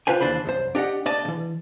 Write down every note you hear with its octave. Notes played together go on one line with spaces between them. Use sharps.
F4 B4 C5 G#5
D#2 E3 D4 C5 B5
C2 F#2 C5
D4 G4 D#5 F#5
A3 D4 D5 D#5 A5
C#3 E3